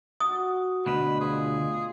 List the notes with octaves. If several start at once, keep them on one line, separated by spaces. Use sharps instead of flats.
F#4 D#6
D2 B2 B4 D#5
F4 G#4 B5